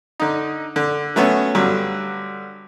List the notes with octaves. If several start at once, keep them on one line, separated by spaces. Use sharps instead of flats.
D3 D#4
D3
F#3 A3 B3 C#4 F#4
G2 D3 F#3